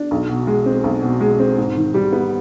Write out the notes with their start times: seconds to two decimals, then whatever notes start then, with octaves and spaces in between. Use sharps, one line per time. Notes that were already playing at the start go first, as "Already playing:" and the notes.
Already playing: D4
0.11 B1
0.29 B2
0.47 G#3
0.66 C4
0.84 B1
1.03 B2
1.21 G#3
1.39 C4
1.58 G#2
1.76 D#3
1.94 G3
2.12 B3